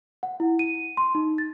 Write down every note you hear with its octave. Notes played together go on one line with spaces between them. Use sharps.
F#5
E4
D#7
C6
D#4
A6